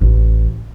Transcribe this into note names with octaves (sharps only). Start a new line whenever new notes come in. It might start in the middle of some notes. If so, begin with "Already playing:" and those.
A1